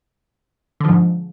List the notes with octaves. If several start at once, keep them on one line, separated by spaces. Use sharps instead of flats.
G#2 D3 F3